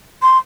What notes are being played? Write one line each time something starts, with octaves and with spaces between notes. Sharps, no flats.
C6